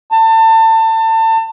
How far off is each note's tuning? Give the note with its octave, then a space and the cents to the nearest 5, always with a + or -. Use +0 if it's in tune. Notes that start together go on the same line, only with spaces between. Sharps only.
A5 +30